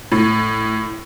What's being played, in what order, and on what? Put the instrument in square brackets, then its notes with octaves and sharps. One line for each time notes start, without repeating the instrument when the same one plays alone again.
[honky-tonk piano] A2